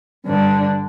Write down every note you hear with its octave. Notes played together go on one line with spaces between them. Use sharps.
G2 D3 G3 D4